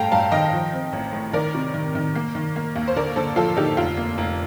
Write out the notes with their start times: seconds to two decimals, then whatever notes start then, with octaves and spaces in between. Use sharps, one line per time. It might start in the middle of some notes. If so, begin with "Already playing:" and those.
Already playing: G2 A3 F5 G5 A5 A#5
0.12 G2 F5 A5
0.32 D#3 D#5 G5
0.53 F3
0.73 C4
0.93 A1
1.13 A2
1.33 D#3 A#4 D5
1.55 C3
1.74 D#3
1.95 D#3
2.15 A#3
2.35 D#3
2.56 A#3
2.76 D#2
2.88 C5
2.96 D3 A#4 D5
3.16 D3 A4 C5
3.36 F3 F4 A4
3.56 D3 D#4 G4
3.77 F1 F4
3.97 A#3
4.18 F1